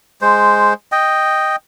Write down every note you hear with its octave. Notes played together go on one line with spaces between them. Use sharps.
G#3 C5
D#5 G5